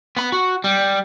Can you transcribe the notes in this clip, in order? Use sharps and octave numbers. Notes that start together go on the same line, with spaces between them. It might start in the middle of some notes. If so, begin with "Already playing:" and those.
B3 B5
F#4
G3